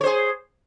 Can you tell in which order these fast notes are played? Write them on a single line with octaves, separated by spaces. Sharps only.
C#5 C5 G#4